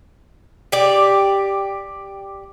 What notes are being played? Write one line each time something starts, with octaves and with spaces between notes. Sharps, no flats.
G4 D5